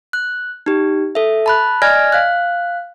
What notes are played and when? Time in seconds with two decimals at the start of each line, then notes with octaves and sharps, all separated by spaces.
0.13 F#6
0.66 D#4 G4
1.15 A4 E5
1.46 A5 B5 F#6
1.82 D5 D#5 G#5 F6 G#6 A#6
2.12 F5 F#6